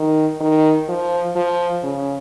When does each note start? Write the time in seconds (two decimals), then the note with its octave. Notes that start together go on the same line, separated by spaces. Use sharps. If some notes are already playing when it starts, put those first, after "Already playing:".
Already playing: D#3
0.40 D#3
0.88 F3
1.36 F3
1.83 C#3